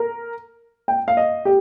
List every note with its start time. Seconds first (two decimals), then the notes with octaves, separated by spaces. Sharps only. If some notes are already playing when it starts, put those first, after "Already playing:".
Already playing: A#4
0.88 G5
1.08 F5
1.17 D#5
1.45 G4